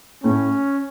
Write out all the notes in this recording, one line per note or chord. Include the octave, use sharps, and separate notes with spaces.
A2 C#4